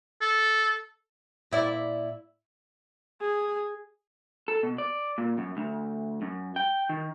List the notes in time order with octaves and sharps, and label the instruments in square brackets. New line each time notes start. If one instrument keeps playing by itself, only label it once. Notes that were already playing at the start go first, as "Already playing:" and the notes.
[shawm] A4
[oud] A#2 E4 D5
[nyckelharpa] G#4
[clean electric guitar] A4
B2
D5
A#2
F#2
D2
F#2
G5
D#3